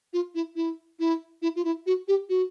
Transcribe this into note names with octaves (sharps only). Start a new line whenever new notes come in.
F4
E4
E4
E4
E4
F4
E4
F#4
G4
F#4